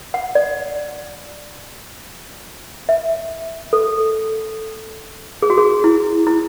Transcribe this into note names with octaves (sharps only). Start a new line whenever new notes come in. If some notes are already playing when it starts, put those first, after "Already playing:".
F#5
D5
E5
A4
G#4
F#4
G#4
E4
E4